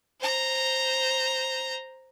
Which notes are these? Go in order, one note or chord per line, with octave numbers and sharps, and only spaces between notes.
C5 A#5